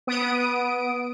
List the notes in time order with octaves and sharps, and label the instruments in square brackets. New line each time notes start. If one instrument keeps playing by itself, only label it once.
[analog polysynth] B3 D#6 D7